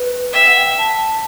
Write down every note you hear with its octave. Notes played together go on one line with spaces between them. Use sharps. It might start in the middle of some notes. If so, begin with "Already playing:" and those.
Already playing: B4
E5 G5
F#5
G5
A5